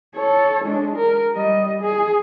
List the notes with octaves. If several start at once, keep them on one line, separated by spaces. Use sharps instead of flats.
A4 C#5
G#3 D4
A#4
G3 D#5
G#4